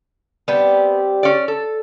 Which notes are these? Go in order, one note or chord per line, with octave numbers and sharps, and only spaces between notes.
G3 B3 C4 G4
C#4 D5
A4